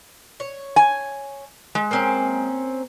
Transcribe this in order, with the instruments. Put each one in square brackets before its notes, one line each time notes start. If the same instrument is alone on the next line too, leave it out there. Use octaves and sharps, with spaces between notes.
[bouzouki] C#5
[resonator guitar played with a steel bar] G#5
G#3
[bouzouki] A#3 C4 C#4